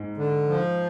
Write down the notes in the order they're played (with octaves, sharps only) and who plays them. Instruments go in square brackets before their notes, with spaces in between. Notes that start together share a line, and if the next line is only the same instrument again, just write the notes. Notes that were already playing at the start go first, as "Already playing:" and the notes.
Already playing: [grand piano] G#2
[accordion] D3
F3